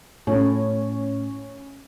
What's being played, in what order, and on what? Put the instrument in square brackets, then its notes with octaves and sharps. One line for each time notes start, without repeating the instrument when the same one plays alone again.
[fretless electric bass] A2 [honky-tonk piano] C#4